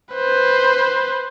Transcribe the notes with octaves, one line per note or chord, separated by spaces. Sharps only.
B4 C5